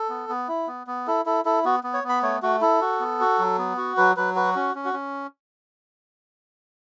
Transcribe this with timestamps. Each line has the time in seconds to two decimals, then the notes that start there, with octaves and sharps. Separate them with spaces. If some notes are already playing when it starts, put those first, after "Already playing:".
Already playing: A4
0.10 B3
0.29 B3
0.48 E4
0.67 B3
0.87 B3
1.07 E4 A4
1.26 E4 A4
1.45 E4 A4
1.65 B3 F#4
1.84 B3
1.94 C#5
2.04 B3
2.09 B5
2.23 A3 C#5
2.43 A3 F#4
2.61 E4 A4
2.81 F#4
3.00 B3
3.20 F#4
3.39 F#3
3.58 B3
3.77 F#4
3.97 F#3 B4
4.17 F#3 B4
4.35 F#4 B4
4.56 C#4
4.75 C#4
4.85 F#4
4.93 C#4